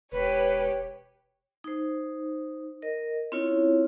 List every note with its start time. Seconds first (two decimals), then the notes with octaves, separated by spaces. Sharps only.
0.12 E1 G4 B4 C#5
1.64 D#4 C5
2.82 A#4 D#5
3.32 C4 C#4 E4 F4 C#5